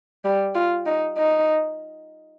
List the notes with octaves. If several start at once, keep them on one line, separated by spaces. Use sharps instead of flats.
G3
F4
D#4
D#4